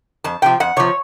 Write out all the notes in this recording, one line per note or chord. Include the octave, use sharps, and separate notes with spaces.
F2 A5
C3 F3 G5
F2 F#5
C3 F3 C#5